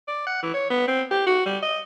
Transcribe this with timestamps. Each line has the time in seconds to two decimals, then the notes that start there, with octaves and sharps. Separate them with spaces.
0.08 D5
0.27 F#5
0.42 E3
0.54 C#5
0.70 B3
0.88 C4
1.11 G4
1.26 F#4
1.46 G3
1.62 D#5